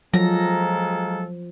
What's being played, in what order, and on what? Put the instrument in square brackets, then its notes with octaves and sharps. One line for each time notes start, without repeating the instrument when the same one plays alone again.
[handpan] F3 [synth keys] F#3 [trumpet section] G#3 A4 F5 [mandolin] A#5